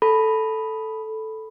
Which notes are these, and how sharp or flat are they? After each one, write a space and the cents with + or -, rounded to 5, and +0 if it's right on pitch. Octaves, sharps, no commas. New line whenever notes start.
A4 +0 B5 +0